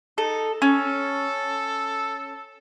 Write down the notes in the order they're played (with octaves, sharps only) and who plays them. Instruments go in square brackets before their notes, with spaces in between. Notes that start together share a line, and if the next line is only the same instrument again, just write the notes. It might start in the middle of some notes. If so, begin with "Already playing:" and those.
[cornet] D#4 [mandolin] A4
[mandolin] C#4 [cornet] A4